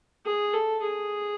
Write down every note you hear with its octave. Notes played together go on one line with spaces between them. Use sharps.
G#4
A4
G#4